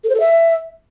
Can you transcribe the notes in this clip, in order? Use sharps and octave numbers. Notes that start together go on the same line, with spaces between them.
A4
C5
A4
E5